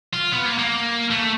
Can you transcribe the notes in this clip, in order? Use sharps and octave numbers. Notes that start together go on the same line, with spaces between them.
F4
B3
A#3
A#3
A3